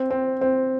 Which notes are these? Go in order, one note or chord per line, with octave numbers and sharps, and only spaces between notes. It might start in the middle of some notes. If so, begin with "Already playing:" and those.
Already playing: C4
C4
C4